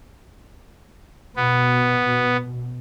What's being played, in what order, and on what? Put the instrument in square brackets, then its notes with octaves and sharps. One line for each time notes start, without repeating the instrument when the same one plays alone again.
[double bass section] B2 [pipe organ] B3